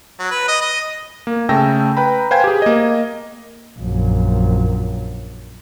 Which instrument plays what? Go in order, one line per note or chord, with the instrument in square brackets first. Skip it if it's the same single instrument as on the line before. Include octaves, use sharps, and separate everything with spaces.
[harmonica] F#3
B4
D#5
D#5
[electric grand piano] A#3
C#3 A3 G5 A5 E6 A#6
B4 G5 A#5 B5
B4 C5 F5 G5 G#5 G#6
G4 G#4
A#3 D#5
[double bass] A#1 F#2